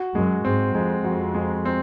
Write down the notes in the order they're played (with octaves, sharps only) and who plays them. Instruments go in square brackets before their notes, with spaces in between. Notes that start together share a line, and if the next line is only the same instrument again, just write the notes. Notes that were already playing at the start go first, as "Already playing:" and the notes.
Already playing: [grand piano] F#4
[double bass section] F#2 [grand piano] G#3
[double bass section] G#2 [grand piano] C4
[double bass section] F2 [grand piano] G#3
[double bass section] F2 [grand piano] F#4
[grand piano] G#3
C4